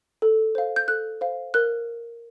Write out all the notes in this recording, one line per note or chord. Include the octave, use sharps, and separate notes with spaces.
A4
C5 F5
G6
A4 F#6
C5 F5
A#4 F#6